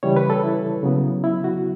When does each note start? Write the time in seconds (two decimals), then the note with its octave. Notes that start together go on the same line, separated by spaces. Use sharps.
0.03 C#3 E3 G3 C#5
0.16 B4
0.30 A4
0.43 E4
0.83 C#3 F#3 B3
1.24 E4
1.44 F#4